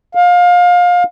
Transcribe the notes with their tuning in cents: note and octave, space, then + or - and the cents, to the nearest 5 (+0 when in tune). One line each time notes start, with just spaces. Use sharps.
F5 +25